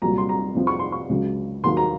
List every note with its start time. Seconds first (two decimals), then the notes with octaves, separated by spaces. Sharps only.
0.02 C2 A#2 F#3 A#5
0.18 C6
0.29 A#5
0.55 F2 C3 F3 C4
0.67 C#6
0.79 C6
0.92 C#6
1.09 C#2 C#3 F#3
1.64 D#2 D#3 F#3 A#3 C6
1.77 A#5